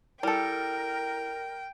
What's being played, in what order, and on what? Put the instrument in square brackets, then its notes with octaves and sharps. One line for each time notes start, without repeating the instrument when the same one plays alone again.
[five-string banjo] G3 A4 [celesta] E4 [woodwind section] A#4 [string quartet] G5